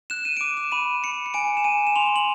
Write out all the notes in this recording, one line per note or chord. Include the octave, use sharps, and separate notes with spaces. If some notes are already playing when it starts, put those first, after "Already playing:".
F#6 E7
D#7
D7
D6 D#7
E7
B5 D#7
B5 C#7
C#7
G#5 D7
E7
G#5 D#7
E7
C6 F7
F#7